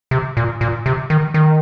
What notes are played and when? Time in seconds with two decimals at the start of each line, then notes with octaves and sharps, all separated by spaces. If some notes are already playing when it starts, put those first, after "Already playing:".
0.11 C3
0.37 A#2
0.61 A#2
0.86 C3
1.10 D#3
1.34 D#3